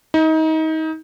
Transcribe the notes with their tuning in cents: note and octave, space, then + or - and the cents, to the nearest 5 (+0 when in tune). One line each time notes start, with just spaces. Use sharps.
D#4 +30